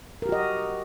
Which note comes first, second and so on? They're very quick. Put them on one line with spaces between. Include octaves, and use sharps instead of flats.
A#4 G4 F#4 D#5